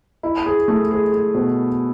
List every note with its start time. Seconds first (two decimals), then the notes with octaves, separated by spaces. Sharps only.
0.23 E4
0.46 G#4
0.68 A3
0.91 G#4
1.12 G#4
1.34 B2